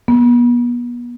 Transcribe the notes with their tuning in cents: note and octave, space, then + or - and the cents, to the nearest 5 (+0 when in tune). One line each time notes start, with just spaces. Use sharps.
B3 -35